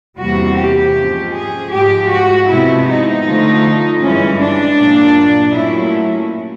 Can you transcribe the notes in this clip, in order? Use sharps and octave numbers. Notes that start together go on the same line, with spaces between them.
E2 C3 E3 G3 A#3 F#4
G4
G#2 F3 G#3 C#4
G#4
G#2 F3 G#3 G4
F#4
C3 F3 G#3 B3 E4
D#4
D3 F3 A3
G2 E3 G#3 C#4
D4
A#2 F#3 A#3
A#2 F#3 A3 C#4 E4